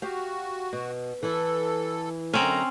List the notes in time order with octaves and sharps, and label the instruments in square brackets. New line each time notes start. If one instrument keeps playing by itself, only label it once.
[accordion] F#4 [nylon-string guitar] G4 F5
[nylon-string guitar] B2
[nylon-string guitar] E3 E4 [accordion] A4
[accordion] F#2 D3 A#5 [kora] C4 C#4